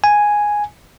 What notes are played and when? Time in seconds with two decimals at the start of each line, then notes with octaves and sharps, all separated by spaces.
0.04 G#5